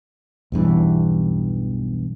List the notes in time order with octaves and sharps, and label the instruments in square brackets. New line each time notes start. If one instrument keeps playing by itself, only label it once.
[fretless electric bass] B1 E2 G2 E3